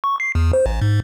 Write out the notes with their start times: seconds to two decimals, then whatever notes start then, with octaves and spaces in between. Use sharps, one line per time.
0.04 C#6
0.20 C7
0.35 E2
0.53 C5
0.66 A1
0.81 G#2